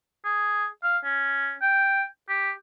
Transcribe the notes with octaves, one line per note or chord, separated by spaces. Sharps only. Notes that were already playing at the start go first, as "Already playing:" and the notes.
G#4
F5
C#4
G5
G4